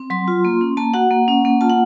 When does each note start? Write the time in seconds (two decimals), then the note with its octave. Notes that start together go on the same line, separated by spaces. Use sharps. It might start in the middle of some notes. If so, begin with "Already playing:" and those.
Already playing: C4
0.10 F#3 C6
0.28 F4
0.45 A#3
0.61 C#4
0.77 A#3 A5
0.94 F#4 F#5
1.11 A#3
1.28 C#4
1.45 A#3
1.61 F4 A5
1.70 F#5